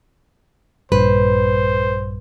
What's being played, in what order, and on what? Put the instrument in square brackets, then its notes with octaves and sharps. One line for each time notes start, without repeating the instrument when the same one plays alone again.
[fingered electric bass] A#1 G2 [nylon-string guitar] B4 [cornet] C5